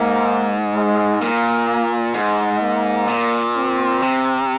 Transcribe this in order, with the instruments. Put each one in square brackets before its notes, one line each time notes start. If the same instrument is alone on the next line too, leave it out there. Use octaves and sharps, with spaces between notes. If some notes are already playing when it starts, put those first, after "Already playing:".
Already playing: [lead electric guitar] G#2 [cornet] A#3
[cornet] G#3
[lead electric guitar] A#2 [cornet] A#3
[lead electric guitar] G#2 [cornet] G#3
[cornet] A#3
[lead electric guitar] A#2
[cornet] C4
[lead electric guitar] C3